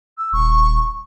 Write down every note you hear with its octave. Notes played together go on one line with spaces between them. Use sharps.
E6
D#1 C#6